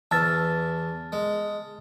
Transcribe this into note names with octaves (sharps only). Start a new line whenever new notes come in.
E2 E5 A5 F6 A6
G#3